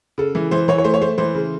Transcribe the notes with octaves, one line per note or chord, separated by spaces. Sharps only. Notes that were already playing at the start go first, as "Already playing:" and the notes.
C#3 A4
E3
E3 C5
E3 C#5
C#5
A3 C5
C#5
A3 C5
E3 C5
C#3